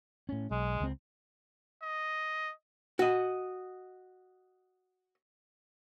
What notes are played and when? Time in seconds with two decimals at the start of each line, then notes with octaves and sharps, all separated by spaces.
0.29 A2 C#4
0.51 B1 G#3
0.80 C#2 C4
1.83 D#5
2.99 F#4 D#5